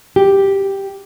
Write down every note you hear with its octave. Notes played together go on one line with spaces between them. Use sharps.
G4